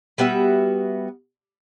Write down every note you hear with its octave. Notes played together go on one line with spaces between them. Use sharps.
G3 B3 F#4 E5